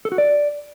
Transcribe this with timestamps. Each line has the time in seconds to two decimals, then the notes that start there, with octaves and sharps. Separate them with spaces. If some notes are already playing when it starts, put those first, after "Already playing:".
0.05 A4
0.12 F#4
0.18 D5